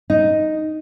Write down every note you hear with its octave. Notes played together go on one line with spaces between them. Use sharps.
D#4